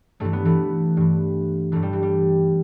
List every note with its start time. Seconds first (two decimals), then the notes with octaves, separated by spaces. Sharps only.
0.20 G2 E3 A3
0.33 B3
0.45 E3 A3
0.97 G2 E3
1.72 G2 E3 A3
1.83 G3
1.93 E3
2.03 G3